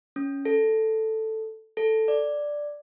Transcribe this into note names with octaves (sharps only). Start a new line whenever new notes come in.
C#4
A4
A4
D5